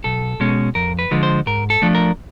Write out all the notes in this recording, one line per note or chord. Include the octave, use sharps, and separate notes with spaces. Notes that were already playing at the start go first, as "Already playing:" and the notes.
B1 A4
B2 G#3 C#4
F2 A#4
B4
D3 F3 G#3
C5
G#2 A#4
A4
F3 A3 D4
A#4